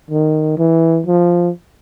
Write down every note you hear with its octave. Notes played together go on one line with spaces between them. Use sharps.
D#3
E3
F3